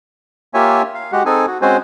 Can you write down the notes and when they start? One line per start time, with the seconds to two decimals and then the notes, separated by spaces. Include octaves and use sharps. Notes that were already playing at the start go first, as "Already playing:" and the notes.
0.54 A#3 F4 G4 C#5 E5 G#5
0.95 F5
1.12 G#3 F#4 G4 F#5
1.26 C4 D#4 G#4 A4 G#5
1.47 F#4
1.62 G#3 C4 C#4 F#4 C5 G#5